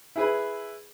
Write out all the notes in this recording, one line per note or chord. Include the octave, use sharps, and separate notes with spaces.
E4 G#4 B4